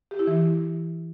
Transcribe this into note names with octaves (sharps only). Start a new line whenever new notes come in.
G4
E4
E3